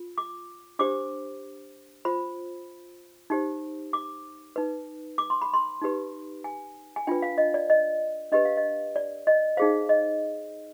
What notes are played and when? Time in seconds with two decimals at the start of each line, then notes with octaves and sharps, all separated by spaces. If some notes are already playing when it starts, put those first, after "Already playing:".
Already playing: F4
0.18 D6
0.79 D4 G4 C5 D6
2.05 F4 C5 B5
3.30 D#4 G4 C5
3.93 D6
4.56 D#4 B4
5.18 D6
5.30 C6
5.42 B5
5.54 C6
5.82 D#4 G4 B4
6.44 G#5
6.96 G#5
7.07 D4 F4 B4 G5
7.22 F5
7.38 D#5
7.54 D5
7.70 D#5
8.32 D4 G4 B4 D#5
8.45 F5
8.57 D#5
8.96 D5
9.27 D#5
9.57 D#4 G#4 C5 F5
9.89 D#5